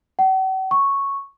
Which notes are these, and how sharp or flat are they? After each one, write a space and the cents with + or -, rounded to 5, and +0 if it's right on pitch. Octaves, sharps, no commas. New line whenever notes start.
F#5 +45
C#6 -5